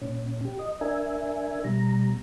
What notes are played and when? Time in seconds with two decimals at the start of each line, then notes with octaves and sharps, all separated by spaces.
0.02 A#2 C#4
0.45 G4
0.59 D#5
0.81 D4 A#4 E5 G#5
1.64 B2 G3 A#5